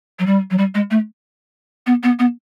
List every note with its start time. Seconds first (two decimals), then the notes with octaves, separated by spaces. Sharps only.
0.19 F#3
0.26 G3
0.51 F#3
0.58 G3
0.75 G#3
0.91 A3
1.87 B3
2.03 B3
2.19 B3